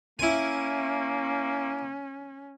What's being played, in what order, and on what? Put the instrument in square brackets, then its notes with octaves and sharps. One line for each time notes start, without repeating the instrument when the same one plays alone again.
[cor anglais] A#3 [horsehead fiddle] C#4 [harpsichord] E4 G#5